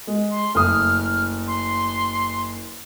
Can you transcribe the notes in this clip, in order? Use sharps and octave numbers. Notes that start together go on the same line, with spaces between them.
G#3
C6
F#1 A3 D#6 F6
C6